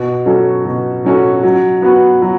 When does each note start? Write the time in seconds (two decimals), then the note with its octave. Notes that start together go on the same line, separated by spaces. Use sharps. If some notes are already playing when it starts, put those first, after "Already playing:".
Already playing: B2
0.26 F#3 C#4 F#4 A4
0.65 B2
1.04 F#3 C#4 F#4 A4
1.43 F#3
1.82 B3 F#4 B4
2.22 F#3